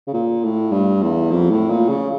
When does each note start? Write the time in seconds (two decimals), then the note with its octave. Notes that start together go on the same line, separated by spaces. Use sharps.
0.08 C#3
0.14 A#2
0.44 A2
0.72 G2
1.02 E2
1.31 F2
1.51 A2
1.70 A#2
1.89 C#3